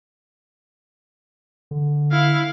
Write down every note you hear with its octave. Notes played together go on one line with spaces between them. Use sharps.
D3
E4 F5